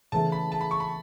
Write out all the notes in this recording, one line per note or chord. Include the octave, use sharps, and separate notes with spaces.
C#3 E3 A3 A5
B5
A5
B5
C#6
B5